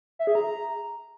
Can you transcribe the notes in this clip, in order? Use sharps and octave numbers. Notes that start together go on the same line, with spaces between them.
E5
G#4
A#5